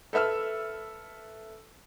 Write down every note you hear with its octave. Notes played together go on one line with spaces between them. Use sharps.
A4 B4 E5 E6 F6